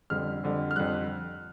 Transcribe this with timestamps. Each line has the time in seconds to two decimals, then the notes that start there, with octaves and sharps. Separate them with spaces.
0.10 F2 D3 G3 F6
0.44 F2 D3 G3
0.71 F6
0.76 F2 D3 G3 F#6